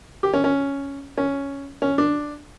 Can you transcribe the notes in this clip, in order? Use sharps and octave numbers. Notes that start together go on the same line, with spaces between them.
G4
C#4
C#4
C#4
C#4
D4